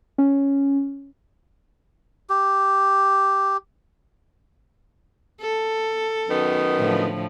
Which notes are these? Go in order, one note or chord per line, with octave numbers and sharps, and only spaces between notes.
C#4
G4
A4
F#2 D#3 B3
A2 D3 F3